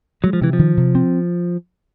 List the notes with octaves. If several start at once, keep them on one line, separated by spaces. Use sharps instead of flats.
F#3 G#3
F3
C3 E3
F3
D#3
C3
C4